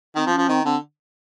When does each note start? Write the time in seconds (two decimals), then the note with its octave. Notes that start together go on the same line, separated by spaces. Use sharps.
0.16 D#3 C4
0.27 F3
0.32 C#4
0.38 F3
0.48 D#3 C4
0.65 D3 C4